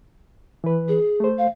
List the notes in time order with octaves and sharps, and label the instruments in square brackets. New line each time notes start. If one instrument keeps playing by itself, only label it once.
[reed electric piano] E3 B4
[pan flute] G#4
[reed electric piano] A3 C5
[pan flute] F5